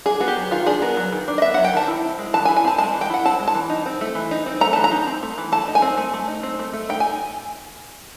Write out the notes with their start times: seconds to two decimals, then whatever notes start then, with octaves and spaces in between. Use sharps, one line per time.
0.06 D4 G#4
0.20 B3 F#4
0.28 G4
0.36 F#3
0.51 D#3 F4
0.66 D4 G#4
0.82 B3 A#4
0.97 F#3
1.13 D#3
1.28 D4
1.38 D#5
1.42 B3 E5
1.54 F#3 F#5
1.64 G5
1.73 D#3 A5
1.87 E4
2.04 C4
2.19 G#3
2.34 E3 A5
2.45 G#5
2.49 E4
2.56 G#5
2.64 C4 A5
2.78 G#3 A5
2.94 E3
3.01 G5
3.10 E4 F#5
3.25 C4 A5
3.40 G#3
3.48 A5
3.55 E3
3.70 D#4
3.86 C4
4.01 A3
4.15 E3
4.31 D#4
4.46 C4
4.61 A3 A#5
4.73 E3 A5
4.84 A#5
4.91 D#4
5.07 C4
5.23 A3
5.38 E3
5.52 A3 A5
5.68 D#4
5.75 G#5
5.82 C4
5.97 A3
6.14 A3
6.28 D#4
6.43 C4
6.59 A3
6.73 A3
6.89 D#4 G5
7.00 G#5